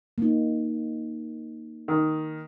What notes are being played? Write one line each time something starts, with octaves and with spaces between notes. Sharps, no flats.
A#3 D#4
D#3